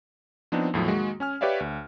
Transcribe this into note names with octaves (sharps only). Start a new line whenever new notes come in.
F3 B3 C4 D4 D#4
E2 A2 F3 F#3
D#3 G#3 A#3 F#4
C#4 G#5 F6
G4 B4 C#5 D5 E5 F5
D2